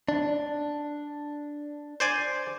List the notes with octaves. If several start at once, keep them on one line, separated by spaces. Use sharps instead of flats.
D4
C5 D5 G#5